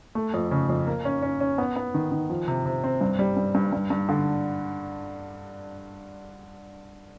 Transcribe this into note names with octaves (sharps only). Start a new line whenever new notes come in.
A3
F2
C#3
F2
A#3
C#4
C#4
C#4
B3
B3
D#3
D#3
F3
C3
C3
C4
G2
G3
G2
G2
G2
G2
D3